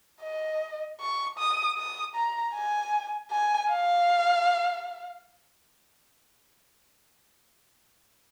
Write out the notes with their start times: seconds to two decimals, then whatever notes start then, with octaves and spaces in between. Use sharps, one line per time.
0.23 D#5
1.00 C#6
1.39 D#6
1.78 D#6
2.15 A#5
2.54 G#5
3.31 G#5
3.70 F5